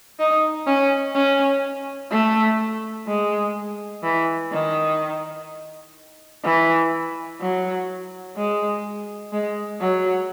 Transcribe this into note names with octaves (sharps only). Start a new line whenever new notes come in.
D#4
C#4
C#4
A3
G#3
E3
D#3
E3
F#3
G#3
G#3
F#3